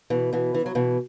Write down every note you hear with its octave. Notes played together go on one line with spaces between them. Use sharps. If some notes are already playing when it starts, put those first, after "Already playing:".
B2 E3
B2 E3
E3
F#3
B2 E3